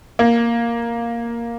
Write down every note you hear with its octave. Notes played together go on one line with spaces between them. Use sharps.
A#3